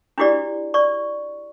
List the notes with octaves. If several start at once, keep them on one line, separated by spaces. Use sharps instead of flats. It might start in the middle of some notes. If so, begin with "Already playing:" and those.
D4 E4 F#4 G4 D5
D5 C#6